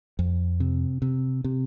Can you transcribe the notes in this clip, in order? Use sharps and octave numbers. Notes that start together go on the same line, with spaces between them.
F2
C3
C3
C3